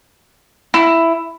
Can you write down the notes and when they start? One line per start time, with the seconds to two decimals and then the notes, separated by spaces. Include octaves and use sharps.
0.74 E4